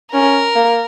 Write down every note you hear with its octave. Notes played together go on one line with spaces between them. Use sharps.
C#4 A#4
A#3